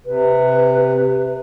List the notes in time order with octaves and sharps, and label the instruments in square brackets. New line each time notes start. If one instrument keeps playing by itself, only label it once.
[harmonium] C3 [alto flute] B4